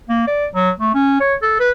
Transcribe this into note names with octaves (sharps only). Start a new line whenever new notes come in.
A#3
D5
F#3
A3
C#4
C#5
A4
B4